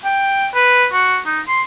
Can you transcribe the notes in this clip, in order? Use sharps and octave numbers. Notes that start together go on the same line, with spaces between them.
G5
B4
F#4
D#4
C6